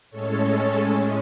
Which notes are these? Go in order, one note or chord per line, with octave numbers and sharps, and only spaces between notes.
A2 G#3 C#4 A4 C#5